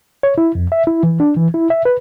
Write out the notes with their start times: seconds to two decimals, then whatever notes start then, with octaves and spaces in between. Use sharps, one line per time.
0.23 C#5
0.38 E4
0.55 F2
0.72 E5
0.87 E4
1.03 E3
1.20 D4
1.36 E3
1.54 E4
1.70 E5
1.85 B4